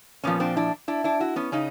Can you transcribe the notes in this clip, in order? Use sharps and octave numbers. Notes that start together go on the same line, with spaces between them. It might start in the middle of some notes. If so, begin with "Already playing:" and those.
A#2 F3 B3 C#4
C4 D4
D4 E4
D4 E4
D4 E4
E4 F#4
B3 C#4
C#3 C#4 D#4